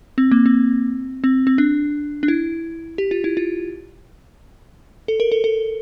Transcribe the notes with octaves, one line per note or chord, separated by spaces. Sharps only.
C4
A#3
C4
C4
C4
D4
D4
E4
G4
F4
E4
F4
A4
A#4
A4
A4